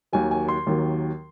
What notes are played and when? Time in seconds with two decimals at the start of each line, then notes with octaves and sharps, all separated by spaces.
0.13 D#2 D#3 F#3 G#5
0.31 G#5
0.49 C6
0.66 D#2 D#3 F#3